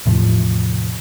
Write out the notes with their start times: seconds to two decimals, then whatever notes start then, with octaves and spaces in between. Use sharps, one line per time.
0.06 E2 A2 C3 F3